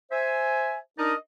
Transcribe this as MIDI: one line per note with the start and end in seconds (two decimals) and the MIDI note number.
0.12 0.78 72
0.12 0.78 76
0.12 0.78 80
0.99 1.15 62
0.99 1.15 63
0.99 1.15 70
0.99 1.15 74
0.99 1.15 75